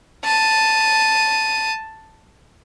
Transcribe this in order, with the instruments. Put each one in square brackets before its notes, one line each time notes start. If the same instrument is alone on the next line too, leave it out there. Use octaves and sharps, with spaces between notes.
[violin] A5 D#7